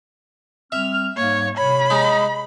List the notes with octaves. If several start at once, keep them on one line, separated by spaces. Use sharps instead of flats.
G3 C4 E5 F6
G#2 G3 A#3 C#5
C3 C#5 B5
G#3 D#4